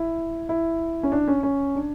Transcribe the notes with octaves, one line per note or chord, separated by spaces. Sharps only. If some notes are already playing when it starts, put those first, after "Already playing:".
Already playing: E4
E4
C#4
D4
C#4
C#4
D4